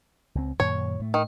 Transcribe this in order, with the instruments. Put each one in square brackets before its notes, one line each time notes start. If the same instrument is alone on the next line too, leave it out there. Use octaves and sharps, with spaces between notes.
[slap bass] C#2 C4
[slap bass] F#2 A#2 D#3 [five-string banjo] C#5
[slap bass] A2 A3
[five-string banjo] D#3